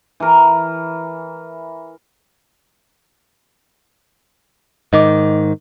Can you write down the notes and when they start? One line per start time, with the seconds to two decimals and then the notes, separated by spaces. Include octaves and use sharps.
0.20 E3 A#4
4.93 G#2 D#3 D#5 D6